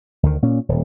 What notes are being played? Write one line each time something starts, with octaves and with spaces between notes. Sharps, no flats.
D2 D#3
A#2 C#4
D#1